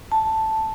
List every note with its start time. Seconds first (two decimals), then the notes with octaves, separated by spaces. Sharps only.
0.12 A5